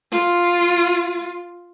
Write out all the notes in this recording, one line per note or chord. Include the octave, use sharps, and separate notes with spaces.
F4